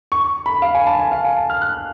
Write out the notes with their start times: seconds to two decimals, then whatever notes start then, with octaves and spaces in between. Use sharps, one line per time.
0.12 C#6
0.46 B5
0.62 F5
0.74 G#5
0.87 A5
0.99 G#5
1.12 F5
1.24 G#5
1.37 A5
1.50 F6
1.62 F#6